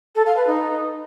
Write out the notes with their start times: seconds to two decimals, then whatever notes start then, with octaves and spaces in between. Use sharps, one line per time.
0.15 A4
0.26 F5
0.36 B4
0.47 D#4